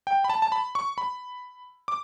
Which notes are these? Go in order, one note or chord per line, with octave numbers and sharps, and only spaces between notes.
G5
B5
A5
A5
B5
C#6
B5
D6